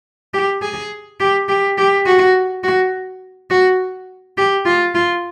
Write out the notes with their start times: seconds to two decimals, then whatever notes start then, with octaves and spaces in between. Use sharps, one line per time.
0.34 G4
0.62 G#4
1.20 G4
1.49 G4
1.78 G4
2.06 F#4
2.64 F#4
3.50 F#4
4.37 G4
4.66 F4
4.95 F4